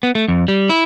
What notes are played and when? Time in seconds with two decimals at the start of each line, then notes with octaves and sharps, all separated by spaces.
0.03 B3
0.15 A3
0.28 F2
0.48 G3
0.69 E4